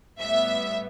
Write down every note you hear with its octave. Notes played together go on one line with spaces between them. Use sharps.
A2 G3 B3 E5